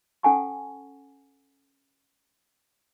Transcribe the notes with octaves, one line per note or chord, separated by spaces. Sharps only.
C#4 A4 F#5 G#5 A5 C#6